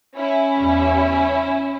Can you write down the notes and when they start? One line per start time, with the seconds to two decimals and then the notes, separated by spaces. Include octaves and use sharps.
0.17 C#4 E4
0.58 E2 C#3 G3